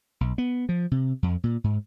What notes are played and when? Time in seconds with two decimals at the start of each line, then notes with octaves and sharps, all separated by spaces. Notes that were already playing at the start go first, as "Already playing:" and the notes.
0.21 B1
0.38 B3
0.69 F3
0.91 C3
1.23 F2
1.44 A#2
1.64 G#2